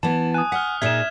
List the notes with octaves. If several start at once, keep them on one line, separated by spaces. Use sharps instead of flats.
E3 B3 A5
G#5 D#6 F#6
F#5 F6 B6
A#2 D#4 G#4 E5 G#6 E7